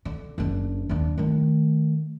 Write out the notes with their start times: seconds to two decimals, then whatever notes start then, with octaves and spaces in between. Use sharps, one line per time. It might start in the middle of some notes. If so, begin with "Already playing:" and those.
0.05 D3
0.38 F#1 D4
0.89 D#2 D4
1.18 D#3 A3